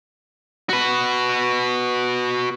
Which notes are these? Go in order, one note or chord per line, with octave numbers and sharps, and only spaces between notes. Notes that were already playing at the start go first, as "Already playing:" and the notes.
F#4 B4